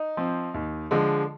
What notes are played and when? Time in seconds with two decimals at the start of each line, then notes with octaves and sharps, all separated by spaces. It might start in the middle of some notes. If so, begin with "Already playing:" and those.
Already playing: D#4
0.17 F3 C4
0.54 D#2
0.91 D3 F3 G#3